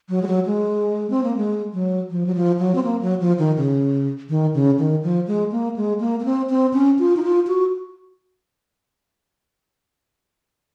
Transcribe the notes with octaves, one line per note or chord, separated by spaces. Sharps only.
F#3
G#3
F#3
G#3
C4
A#3
G#3
F#3
F3
F#3
F3
F#3
C4
A#3
F#3
F3
D#3
C#3
D#3
C#3
D#3
F3
G#3
A#3
G#3
A#3
A#3
C4
C4
C#4
F4
D#4
F4
F#4